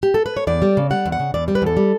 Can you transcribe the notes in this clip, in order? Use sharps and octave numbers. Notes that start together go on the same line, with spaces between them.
G4
A4
B4
C#5
E2 D5
G3
C#3
G3 F#5
E2
F#5
C#3
E2 D5
G3
B4
E2 A4
G3